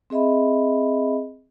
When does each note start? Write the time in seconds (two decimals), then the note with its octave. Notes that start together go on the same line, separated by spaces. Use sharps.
0.10 C4 G#4 D#5 E5 B5